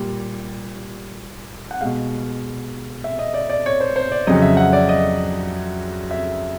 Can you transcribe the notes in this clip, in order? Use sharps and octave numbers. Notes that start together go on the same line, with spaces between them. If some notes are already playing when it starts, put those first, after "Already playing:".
Already playing: A#2 G3
F#5
B2 G#3 F5
E5
D#5
D5
D5
C#5
C5
C5
D5
F2 C#3 F#3 D#5
E5
F#5
D5
D#5
E5